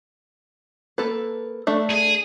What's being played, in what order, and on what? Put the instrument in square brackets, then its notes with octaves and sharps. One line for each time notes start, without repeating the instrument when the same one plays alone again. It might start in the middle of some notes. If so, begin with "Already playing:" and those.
[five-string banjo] A#3 A4 B4
A3 D4 E5
[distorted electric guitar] G#4